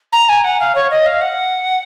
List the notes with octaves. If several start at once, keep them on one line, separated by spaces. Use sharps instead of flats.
A#5
G#5
F#5
F5
C#5
D#5
F5
F#5